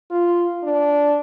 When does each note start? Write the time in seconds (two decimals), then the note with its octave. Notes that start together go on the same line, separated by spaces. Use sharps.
0.11 F4
0.63 D4